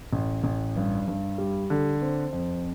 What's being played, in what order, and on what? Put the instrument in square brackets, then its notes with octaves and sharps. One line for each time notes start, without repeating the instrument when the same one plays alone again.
[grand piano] A1
A1
G2
G2
G3
D3
C4
F2